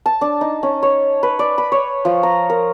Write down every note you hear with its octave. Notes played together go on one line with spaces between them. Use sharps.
A5
D4
D#4
C#4
C#5
B4
D5
B5
C#5
F3
A#5
A#4